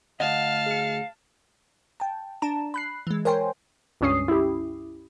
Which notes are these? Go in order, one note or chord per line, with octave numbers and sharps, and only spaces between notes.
D2 D#5 F5 F#5 A5 F6
G#4 C#7
G5 A5
D4 A5 A#5 E7
B5 F#6 C7
E3 G#3
A#4 C5 C#5 G5 G#5 C6
C#2 G2 C#4 D#6 C7
E4 G4